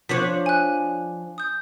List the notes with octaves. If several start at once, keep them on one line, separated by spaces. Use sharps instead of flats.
F3 D4 C#5 B6
G#5 F#6
D#6 G6